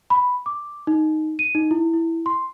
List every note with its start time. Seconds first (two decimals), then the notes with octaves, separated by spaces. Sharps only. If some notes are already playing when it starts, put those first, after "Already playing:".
0.10 B5
0.46 D6
0.87 D#4
1.39 D#7
1.55 D#4
1.71 E4
1.94 E4
2.26 C6